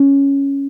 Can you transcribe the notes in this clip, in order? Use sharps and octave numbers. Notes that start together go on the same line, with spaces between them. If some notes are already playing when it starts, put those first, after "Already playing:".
Already playing: C#4